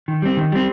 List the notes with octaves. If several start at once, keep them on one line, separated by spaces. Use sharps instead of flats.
D#3
G3 C4
D#3
G3 C4